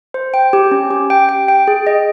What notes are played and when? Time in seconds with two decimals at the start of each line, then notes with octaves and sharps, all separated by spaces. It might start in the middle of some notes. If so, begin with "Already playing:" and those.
0.14 C5
0.34 G5
0.53 G4
0.71 C#4
0.91 G4
1.10 G5
1.29 G5
1.48 G5
1.68 G#4
1.87 D#5